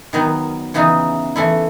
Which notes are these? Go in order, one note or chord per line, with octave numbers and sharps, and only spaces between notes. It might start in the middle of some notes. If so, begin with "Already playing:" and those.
D#3 F#3 B3
C#3 E3 B3 D#4
E3 A3 E4